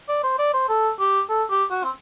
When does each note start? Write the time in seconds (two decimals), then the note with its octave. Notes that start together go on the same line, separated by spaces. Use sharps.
0.08 D5
0.23 C5
0.38 D5
0.54 C5
0.69 A4
1.00 G4
1.29 A4
1.50 G4
1.71 F#4
1.84 C4